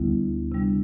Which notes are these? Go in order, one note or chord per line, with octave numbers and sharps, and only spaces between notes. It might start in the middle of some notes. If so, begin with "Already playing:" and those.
Already playing: D2 D3 G3 B3 E4
C3 G3 D4